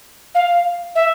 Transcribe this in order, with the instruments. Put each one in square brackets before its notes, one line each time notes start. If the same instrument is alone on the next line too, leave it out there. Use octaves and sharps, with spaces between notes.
[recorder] F5
E5